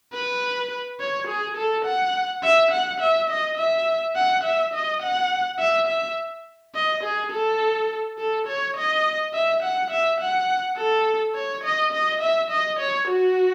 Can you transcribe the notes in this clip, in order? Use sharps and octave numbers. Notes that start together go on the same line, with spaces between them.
B4
C#5
G#4
A4
F#5
E5
F#5
E5
D#5
E5
F#5
E5
D#5
F#5
E5
E5
D#5
G#4
A4
A4
C#5
D#5
E5
F#5
E5
F#5
A4
C#5
D#5
D#5
E5
D#5
C#5
F#4